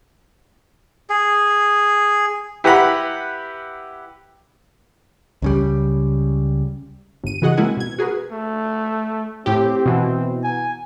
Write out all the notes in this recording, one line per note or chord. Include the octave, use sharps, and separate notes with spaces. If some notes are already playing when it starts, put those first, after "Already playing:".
G#4
E4 G4 B4 F#5 A#5 B5
C#2 C#3 G3
G1 D#7
C#3 E3 F#4 G#4 D#5 F#5
G#3 A#3 C4 E4 F#5 G#5
B2 G#6
F#4 G#4 A#4 B4
A3
A2 C4 G4
B2 E3
G#5